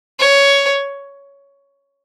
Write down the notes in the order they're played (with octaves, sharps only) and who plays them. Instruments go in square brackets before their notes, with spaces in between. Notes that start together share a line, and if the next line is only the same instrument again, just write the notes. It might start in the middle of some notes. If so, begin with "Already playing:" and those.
[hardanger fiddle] C#5